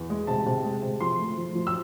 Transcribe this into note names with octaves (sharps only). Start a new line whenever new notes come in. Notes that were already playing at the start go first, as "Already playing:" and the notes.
Already playing: E2
G#3
C3 A5
C3
G#3
C3
F3 C6
A3
F3
F3
E6